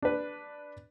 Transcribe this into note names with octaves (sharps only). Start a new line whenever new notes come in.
D4 B4